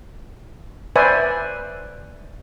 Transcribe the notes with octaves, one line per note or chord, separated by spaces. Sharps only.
B4 C5 D5 E5 G#5